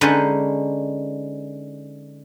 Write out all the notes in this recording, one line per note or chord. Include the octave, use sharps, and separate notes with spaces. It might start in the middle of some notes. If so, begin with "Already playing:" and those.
D3 G#3 C#4 D#4 B4 C5